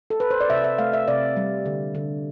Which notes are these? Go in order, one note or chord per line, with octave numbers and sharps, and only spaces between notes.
A4
B4
C5
D5
C3 E5
E5
A3 F5
E5
C3 D5
G3
D3
D3